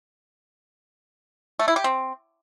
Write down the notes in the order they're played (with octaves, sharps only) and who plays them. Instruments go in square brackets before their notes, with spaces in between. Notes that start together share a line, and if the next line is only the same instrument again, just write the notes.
[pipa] A3
E4
G4
C4